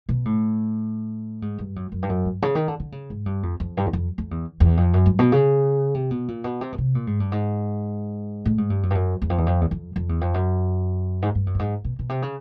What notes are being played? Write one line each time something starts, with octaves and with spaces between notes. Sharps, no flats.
B2
A2
G#2
G2
F#2
F#2
G2
F#2
G2
C#3
D#3
D3
D3
C#3
G#2
G2
F2
F2
G2
E2
F2
F2
E2
E2
F2
F#2
G2
B2
C#3
C3
B2
A#2
B2
C3
B2
C3
A#2
G#2
G2
G#2
A2
G#2
G2
F#2
G2
F#2
E2
F2
E2
F2
E2
F2
F2
E2
F2
F#2
G#2
G2
F#2
G2
G#2
B2
B2
C3
C#3